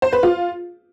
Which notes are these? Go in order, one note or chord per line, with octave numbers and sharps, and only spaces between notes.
C5
B4
F4